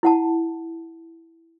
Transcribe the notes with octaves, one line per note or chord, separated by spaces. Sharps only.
E4 F#5 A5